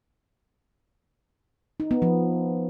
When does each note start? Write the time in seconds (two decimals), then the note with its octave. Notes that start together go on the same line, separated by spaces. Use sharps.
1.80 D#4
1.91 B3
2.02 F3